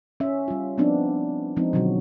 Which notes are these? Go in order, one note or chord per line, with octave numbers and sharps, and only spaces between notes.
C#4 E5
G3 F4
F3 B3 C4 D4 D#4
F3 G#3 C4 D#4
B2 D3 D#3 F#3 F#4